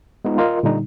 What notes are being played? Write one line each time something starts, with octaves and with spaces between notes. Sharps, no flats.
G#3 B3 D#4 F4
F4 A#4 D#5
A#2 D3 G3 D#4